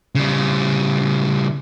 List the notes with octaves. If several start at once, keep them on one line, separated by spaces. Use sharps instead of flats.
C#3 G3